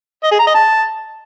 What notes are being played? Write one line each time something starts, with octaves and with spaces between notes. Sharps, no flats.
D#5
G#4
A#5
D#5
A5